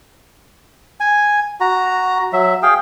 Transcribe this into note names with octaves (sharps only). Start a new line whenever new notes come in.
G#5
F#4 A#5
F#3 E5
G#4 F5 G5